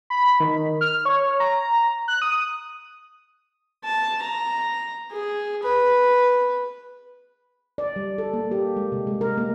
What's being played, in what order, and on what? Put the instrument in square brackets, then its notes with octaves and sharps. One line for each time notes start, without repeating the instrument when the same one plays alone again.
[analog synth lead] B5
D#3
F6
C#5
A#5
F#6
D#6
[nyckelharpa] A5
A#5
G#4
B4
[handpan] D5
G3
A4
A#3
G4
G#3
C3
G#3
A#4
A#3